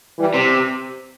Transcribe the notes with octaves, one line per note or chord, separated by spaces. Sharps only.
E3 G3
C3